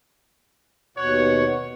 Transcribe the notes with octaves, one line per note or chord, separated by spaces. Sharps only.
D#2 B2 C#5 F#5